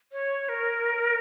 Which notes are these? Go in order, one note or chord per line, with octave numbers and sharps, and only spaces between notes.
C#5
A#4